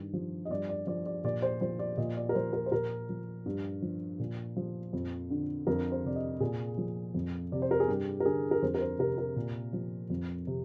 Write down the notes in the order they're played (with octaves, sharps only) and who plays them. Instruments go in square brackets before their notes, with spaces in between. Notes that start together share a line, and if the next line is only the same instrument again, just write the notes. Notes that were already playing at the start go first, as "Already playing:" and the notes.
Already playing: [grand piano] G2 D#3
F3
D#5
G2 D5
D5
F3 D5
D5
A#2 D5
C5
F3 C5
D5
A#2 D#5
D5
A#4
F3 C5
A#4
C5
A#2 A#4
F3
G2
F3
A#2
F3
F2
D3
F2 A#4
C5
C3 D5
D#5
A#2 G#4
F3
F2
C3 D5
C5
A#4
G#4
G2 G4
A#4
D3 G#4
A#4
F2 C5
A#4
C5
C3 A#4
A#4
A#2
F3
F2
C3